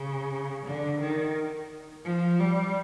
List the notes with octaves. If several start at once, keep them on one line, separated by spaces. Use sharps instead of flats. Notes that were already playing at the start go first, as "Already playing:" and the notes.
Already playing: C#3
D3
D#3
F3
G3